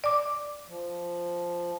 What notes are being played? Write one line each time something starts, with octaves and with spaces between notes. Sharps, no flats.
D5 D6
F3